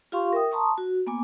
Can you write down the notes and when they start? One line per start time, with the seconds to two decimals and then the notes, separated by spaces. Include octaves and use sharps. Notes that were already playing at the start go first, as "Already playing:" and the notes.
0.12 F4 G4 F5 C6 C#6
0.33 A#4 E5 G5 D#6
0.52 A5 A#5 C6 C#6 D#6
0.78 F#4
1.07 A#3 B3 G#5 D6